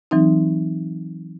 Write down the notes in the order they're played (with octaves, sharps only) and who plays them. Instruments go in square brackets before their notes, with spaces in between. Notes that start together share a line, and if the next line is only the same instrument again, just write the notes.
[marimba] E3 F#3 C4 D#4